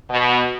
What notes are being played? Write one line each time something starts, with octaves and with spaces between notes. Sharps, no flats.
B2